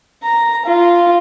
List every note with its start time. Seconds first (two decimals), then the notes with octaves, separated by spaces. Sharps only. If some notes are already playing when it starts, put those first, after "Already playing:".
0.23 A#5
0.65 F4